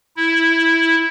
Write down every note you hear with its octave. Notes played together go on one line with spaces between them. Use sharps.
E4